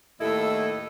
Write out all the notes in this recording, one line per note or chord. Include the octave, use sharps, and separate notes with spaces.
D#2 A2 E4 A4 D#5